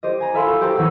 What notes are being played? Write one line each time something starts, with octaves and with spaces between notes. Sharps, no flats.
G4 C5 D#5
G#5 A#5
G#4 A4 E5 F5 B5 C6
F#4
G4 C5 G5 A5 A#5
E3 C#4 F#5 A#5 E6